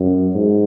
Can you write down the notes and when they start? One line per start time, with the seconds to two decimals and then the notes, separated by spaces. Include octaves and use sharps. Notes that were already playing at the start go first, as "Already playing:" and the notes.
Already playing: F#2
0.35 G#2